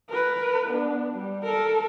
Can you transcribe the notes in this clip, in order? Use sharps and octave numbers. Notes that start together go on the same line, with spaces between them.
A#4 B4
B3 D4
G3
A4 A#4